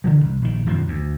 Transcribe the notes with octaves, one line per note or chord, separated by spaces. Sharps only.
A2 C#3 E3 F3
C2
A#1 D#3
E1 F#2 D#3 F3
D2